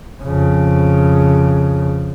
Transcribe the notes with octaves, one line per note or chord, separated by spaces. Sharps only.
F2 C#3